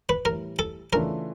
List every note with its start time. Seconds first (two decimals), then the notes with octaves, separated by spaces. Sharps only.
0.09 B4
0.25 A2 E3 G3 A#4
0.59 A4
0.93 C#3 E3 A3 D4 F4 A#4